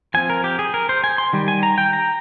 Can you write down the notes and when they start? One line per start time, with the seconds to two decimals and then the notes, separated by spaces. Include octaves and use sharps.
0.14 F3 C4 G#5
0.30 A#4
0.44 G4
0.59 G#4
0.74 A#4
0.89 C5
1.04 G#5
1.18 C6
1.33 D#3 G3
1.48 G#5
1.63 A#5
1.78 G5
1.93 A#5